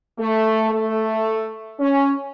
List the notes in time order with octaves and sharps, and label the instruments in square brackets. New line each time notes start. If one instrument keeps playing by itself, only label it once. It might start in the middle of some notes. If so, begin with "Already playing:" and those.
[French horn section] A3
A3
C#4